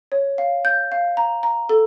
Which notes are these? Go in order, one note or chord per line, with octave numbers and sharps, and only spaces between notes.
C#5
F5
G6
F5
A#5
A#5
A4